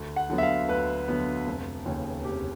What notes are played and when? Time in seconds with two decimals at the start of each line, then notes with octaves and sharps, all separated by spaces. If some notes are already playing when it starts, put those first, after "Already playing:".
Already playing: D2
0.16 F#5
0.30 D3 F#3 B3
0.38 E5
0.43 F5
0.69 D2 B4
1.08 D3 F#3 B3
1.47 F1
1.86 D#2 C#3
2.25 F1 G4